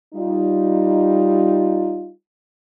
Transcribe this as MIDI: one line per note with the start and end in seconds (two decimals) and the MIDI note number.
0.14 2.10 55
0.14 2.10 63
0.14 2.10 65